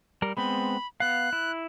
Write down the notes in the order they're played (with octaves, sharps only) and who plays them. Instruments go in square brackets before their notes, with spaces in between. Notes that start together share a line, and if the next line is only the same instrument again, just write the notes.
[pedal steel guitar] G3 A#4
[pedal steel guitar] G#3 B3 C4 [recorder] B5
[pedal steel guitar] B3 F5 [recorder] F#6
[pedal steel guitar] E4